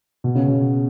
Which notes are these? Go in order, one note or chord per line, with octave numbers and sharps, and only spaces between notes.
B2
C#3
B2